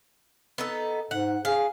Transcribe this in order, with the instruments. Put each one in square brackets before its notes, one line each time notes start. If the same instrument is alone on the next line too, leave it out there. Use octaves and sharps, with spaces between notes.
[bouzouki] B3 D#4 A4
[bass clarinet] G#2 [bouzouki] F#5
[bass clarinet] G#4 [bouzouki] F5